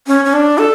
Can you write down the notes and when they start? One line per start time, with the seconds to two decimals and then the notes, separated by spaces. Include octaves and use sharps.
0.07 C#4
0.25 C#4
0.33 D4
0.58 A4